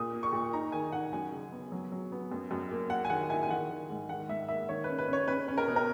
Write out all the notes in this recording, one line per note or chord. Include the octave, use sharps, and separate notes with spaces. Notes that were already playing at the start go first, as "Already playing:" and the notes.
Already playing: A#2 D#6
A#3
C#6
A#2
D#4 A#5
D#3 G#5
D#4 F#5
F#2 G#5
C#3
B3
F#3
F#3
B3
F#2
F#2
A#3
A#3 F#5
G#5
D#3 F#5
E4 G#5
G#5
D#3 F#5
D#3
G#2
D#3 F#5
G#2 E5
A#3 E5
D#3 C#5
C#4 B4
B4
C#4
C#5
C#4 B4
C#4
A#4
B2
A#4